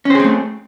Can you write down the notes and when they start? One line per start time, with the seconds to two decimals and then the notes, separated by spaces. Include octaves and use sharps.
0.05 C#4
0.10 C5
0.15 G#4
0.20 C4
0.24 A3